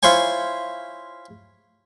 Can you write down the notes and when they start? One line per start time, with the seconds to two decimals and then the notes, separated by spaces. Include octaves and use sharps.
0.03 E4 F4 C5 C#5 G#5